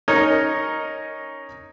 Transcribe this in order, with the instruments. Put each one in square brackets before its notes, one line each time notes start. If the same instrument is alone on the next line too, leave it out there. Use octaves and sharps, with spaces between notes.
[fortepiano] C#4 D#4 A#4 C#5 D#5